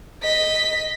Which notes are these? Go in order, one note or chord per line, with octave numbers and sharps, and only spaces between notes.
D#5 B6